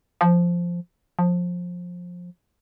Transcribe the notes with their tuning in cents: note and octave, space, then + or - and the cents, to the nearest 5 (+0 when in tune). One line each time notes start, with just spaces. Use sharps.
F3 -5
F3 +20